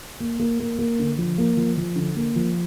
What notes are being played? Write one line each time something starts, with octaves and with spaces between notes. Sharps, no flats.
A#3
A#3
A#3
A#3
D3
F3
A#3
F3
F3
D3
A#3
F3